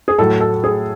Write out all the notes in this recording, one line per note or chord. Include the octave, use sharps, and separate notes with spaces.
G#4
A2 F#3 A4
A4
G#4